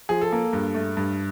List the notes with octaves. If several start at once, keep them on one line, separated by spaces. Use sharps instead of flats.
F3 G#4
A4
A#3
G2
A3
G2